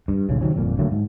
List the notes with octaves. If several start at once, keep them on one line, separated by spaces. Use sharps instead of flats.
G2
D#1 B1 C#3
C3 D#3 F#3 C#4
G1 F2 A#2
D3 F#3 A3 A#3
G#2